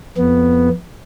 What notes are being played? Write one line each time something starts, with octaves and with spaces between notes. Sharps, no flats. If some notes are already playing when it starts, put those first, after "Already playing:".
F2 B3